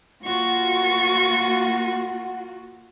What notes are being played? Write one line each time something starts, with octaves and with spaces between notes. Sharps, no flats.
A#3 F4 F#4 F#5 C#6